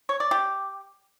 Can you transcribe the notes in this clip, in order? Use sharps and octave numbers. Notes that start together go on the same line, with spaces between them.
C#5
D5
G4